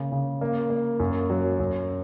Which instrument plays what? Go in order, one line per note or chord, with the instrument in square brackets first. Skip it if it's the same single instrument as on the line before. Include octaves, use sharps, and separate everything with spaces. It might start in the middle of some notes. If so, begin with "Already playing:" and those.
Already playing: [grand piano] C#3 A#3
C#3
A#3
A#3
F#2
F#3
F#2